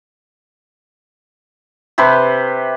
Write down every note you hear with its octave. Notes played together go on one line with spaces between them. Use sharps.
C3 G4 B4 C5